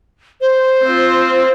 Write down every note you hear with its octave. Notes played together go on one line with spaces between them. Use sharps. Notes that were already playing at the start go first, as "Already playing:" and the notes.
C5
C4 F4